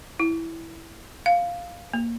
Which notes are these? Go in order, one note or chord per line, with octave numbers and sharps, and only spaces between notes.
E4
F5
A#3